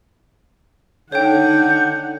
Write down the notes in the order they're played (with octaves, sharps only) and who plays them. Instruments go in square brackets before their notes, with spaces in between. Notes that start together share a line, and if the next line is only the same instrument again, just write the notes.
[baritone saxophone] D3 [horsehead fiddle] D#4 F#5 [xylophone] C#5 G5 [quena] G6